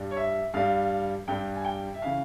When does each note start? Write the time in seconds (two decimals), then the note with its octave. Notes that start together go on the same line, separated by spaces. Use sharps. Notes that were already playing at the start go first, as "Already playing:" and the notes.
Already playing: G2 G3
0.11 C#5
0.17 E5
0.54 G2 G3 F5
1.28 G2 G3 G5
1.56 G#5
1.65 G5
1.94 E5
2.02 C#3 E3 F5